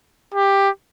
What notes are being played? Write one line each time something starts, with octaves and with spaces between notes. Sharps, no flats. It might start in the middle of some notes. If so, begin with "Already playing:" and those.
G4